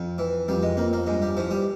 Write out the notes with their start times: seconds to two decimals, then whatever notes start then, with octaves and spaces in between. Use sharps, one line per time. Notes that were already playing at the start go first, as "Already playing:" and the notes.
Already playing: F2 F3
0.18 E3
0.48 F2 G3
0.62 G#3
0.77 F2 A#3
0.93 A#3
1.07 G2 G#3
1.22 G3
1.37 E3 F3
1.51 G3